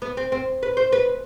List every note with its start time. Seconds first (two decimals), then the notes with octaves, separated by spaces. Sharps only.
0.02 B3
0.17 C4
0.32 C4
0.63 B4
0.77 C5
0.92 B4